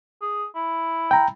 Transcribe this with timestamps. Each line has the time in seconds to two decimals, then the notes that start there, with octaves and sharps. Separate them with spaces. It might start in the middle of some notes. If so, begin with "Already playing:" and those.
0.22 G#4
0.55 E4
1.11 G5 A#5